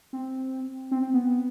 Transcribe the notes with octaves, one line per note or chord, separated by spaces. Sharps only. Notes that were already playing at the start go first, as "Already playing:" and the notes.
C4
C4
C4
B3